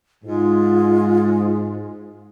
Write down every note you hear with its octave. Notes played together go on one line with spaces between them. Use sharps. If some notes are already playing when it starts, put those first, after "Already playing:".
G#2 G#3 F4